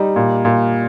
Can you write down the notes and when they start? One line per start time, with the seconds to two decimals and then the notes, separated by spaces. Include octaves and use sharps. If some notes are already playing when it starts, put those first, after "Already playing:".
Already playing: G3 D#4
0.16 A#2
0.45 A#2